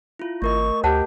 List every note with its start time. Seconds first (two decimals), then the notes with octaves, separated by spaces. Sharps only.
0.19 E4 F4
0.42 G#1 A3 A#4 D#5 C#6
0.84 D2 G4 C5 F#5 A5